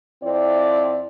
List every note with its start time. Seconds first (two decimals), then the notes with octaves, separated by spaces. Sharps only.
0.23 F2 C4 E4 D5